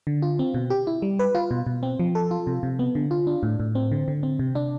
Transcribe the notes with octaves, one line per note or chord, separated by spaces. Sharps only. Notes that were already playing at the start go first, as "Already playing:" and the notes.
D3
F4
C4
B2
G4
E4
G3
B4
F4
B2
B2
C4
F3
A4
F4
C3
C3
B3
D3
F4
D4
A2
A2
C4
D3
D3
C4
C3
D4